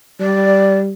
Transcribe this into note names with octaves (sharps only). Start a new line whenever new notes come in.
G3 D5